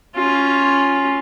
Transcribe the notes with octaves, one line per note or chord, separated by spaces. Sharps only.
C#4 F4